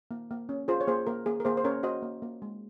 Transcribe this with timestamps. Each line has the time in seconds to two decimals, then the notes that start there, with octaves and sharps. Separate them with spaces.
0.11 A#3
0.31 A#3
0.49 C#4
0.68 F4 G#4 C5
0.81 C#5
0.87 A#3 G#4 C5
1.07 A#3 A#4
1.26 A#3 G#4
1.40 A#4
1.45 A#3 G#4 C5
1.57 C5
1.64 C#4 A#4 C#5
1.83 F#4 C5 D#5
2.02 A#3
2.22 A#3
2.42 G#3